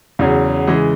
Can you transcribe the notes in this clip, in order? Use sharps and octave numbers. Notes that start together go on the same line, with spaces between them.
E2 C#3 F#3
C#3 E3 G#3